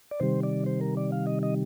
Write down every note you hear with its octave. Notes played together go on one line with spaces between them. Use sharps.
D5
C3 D#3 G3 C5
D5
C5
A#4
D5
F5
D#5
D#5